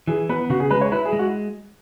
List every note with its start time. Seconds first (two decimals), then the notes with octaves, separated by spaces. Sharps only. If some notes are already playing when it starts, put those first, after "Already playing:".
0.07 E3 G#4
0.29 B3 B4
0.50 C#3 F#4
0.60 G#4
0.70 G#3 B4
0.81 C#5
0.92 E4 B4
1.05 G#4
1.13 G#3
1.19 F#4